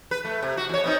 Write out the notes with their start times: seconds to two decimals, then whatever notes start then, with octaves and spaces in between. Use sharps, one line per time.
0.11 B4
0.25 A3
0.42 C3
0.57 F#4
0.69 E2 C#5
0.84 B3 C4 D#4